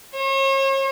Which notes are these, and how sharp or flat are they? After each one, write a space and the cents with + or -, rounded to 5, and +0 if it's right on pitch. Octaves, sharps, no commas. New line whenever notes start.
C#5 -40